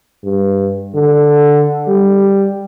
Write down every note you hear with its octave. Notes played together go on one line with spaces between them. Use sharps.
G2
D3
G3